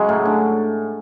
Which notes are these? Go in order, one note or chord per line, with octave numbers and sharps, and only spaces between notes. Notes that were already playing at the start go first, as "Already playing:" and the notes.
Already playing: C#3 F#3 G#3 C#4
A2
D4